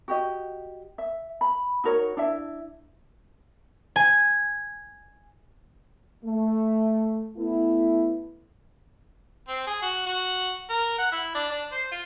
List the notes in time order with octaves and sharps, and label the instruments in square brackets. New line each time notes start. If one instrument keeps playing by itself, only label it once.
[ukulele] F#4 G4 D#5
E5
B5
D#4 F#4 A#4 C#5
D4 E4 E5
[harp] G#5
[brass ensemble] A3
A3 B3 E4
[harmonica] C4
G#4
F#4
F#4
A#4
F#5
E4
D4
D4
C5
F4